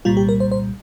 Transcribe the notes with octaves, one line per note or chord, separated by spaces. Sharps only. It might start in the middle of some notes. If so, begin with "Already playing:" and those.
C2 A#2 G3 F4
G4
A#4
C5
C5